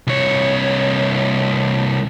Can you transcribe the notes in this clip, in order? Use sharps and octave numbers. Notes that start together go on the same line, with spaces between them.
C2 C#5